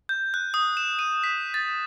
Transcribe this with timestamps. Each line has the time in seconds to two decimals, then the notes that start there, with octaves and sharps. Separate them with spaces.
0.09 G6
0.34 F#6
0.54 D#6
0.77 E7
0.99 D#7
1.24 B6
1.54 A6